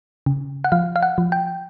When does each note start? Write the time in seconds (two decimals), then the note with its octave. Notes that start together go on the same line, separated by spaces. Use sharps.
0.26 C#3
0.64 F#5
0.72 F3 F5
0.96 F5
1.03 F#5
1.18 F3
1.32 G5